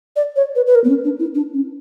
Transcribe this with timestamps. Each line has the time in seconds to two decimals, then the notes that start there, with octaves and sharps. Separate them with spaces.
0.16 D5
0.36 C#5
0.55 B4
0.67 B4
0.75 A#4
0.84 B3
0.90 C#4
1.04 D4
1.19 E4
1.35 D4
1.54 C#4